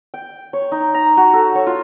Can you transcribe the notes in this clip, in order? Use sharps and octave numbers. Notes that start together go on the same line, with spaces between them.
G5
C#5
D#4
A#5
F#4
A4
C#5
F4